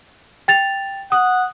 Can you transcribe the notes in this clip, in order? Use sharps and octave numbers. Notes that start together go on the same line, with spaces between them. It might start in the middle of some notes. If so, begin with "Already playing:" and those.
G5 A6 F7
F#5 D#6